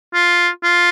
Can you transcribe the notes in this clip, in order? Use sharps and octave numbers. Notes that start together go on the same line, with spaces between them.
F4
F4